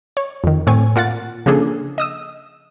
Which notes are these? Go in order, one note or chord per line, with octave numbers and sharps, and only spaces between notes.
C#5
F2 D#3
A2 C4 C#5 G#5
A#2 F4 F#5 A6
C#3 F3 A#3 D4 G#4 A4
D#5 D#6 E6